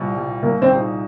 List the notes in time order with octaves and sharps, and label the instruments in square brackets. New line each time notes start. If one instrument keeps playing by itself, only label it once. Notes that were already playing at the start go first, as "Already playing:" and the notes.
Already playing: [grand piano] C2 A#2 G3
A#2 G3
[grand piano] C2 [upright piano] A#3
[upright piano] C4
[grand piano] A#2 G#3 D#4